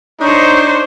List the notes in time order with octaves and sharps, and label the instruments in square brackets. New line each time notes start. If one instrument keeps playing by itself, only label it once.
[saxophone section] D4 [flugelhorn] D#4 [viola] C5 C#5